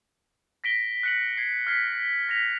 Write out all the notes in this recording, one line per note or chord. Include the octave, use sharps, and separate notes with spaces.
A#6 B6 D7 G7
F#6 C#7 F#7
G#6 C7
F6 G#6 B6 C7
A#6 B6 F7